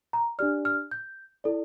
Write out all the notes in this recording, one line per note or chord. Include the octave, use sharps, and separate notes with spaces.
A#5
D4 G4 D5 F6
F6
G6
E4 A4 D5